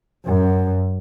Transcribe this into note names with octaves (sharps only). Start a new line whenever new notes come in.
F#2